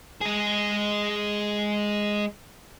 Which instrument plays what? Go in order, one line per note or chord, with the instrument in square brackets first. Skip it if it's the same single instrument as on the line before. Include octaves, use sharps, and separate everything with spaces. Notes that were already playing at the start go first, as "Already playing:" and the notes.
[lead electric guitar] G#3 G#4